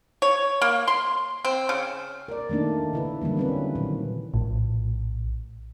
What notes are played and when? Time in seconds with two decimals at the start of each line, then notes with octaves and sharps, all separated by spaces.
0.22 C#5
0.61 A#3
0.88 C6
1.45 C4
1.69 C#3
2.28 A#4 D5
2.49 D#3 A3 A#3 D4 D#4
2.93 C#3 E4 B4
3.22 D3 E3 F#3 G3 A#3
3.37 C4 C#4 B4
3.75 A#2 D#3 F#3
4.34 A#1 A2